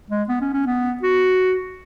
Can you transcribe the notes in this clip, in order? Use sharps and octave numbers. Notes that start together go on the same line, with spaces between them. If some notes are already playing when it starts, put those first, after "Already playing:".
G#3
B3
C#4
C#4
B3
F#4